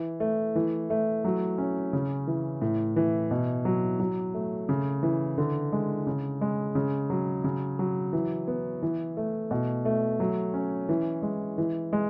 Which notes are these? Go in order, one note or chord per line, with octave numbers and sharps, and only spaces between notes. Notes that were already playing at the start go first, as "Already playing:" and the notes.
Already playing: E3
A3
E3
A3
F#3
C#4
C#3
E3
A2
E3
B2
F#3
F#3
A3
C#3
E3
D3
G#3
C#3
G#3
C#3
F#3
C#3
F#3
E3
B3
E3
A3
B2
A3
F#3
C#4
E3
G#3
E3
G#3